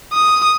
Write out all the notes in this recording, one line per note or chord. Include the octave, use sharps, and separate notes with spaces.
D#6